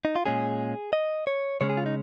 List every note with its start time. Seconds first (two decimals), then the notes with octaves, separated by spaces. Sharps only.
0.05 D#4
0.16 F4
0.26 A#2 G#3 C#4 G#4
0.93 D#5
1.27 C#5
1.61 C#3 G#3 C#4 C#5
1.70 G#4
1.77 F4
1.86 D#4